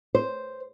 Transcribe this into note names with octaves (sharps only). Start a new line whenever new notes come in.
C5